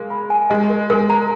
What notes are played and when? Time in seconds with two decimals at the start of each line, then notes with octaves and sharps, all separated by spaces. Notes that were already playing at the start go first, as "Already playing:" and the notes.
Already playing: G#3 A#3 G#4
0.10 B5
0.30 G#5
0.50 G#3 D#5
0.70 A#4
0.90 G#3 A#4
1.10 A#5